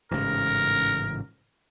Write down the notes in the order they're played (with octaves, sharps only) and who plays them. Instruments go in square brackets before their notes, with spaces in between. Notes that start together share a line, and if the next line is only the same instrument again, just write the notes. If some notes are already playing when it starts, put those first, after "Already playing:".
[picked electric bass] A1 G#2 C#3 [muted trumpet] A#4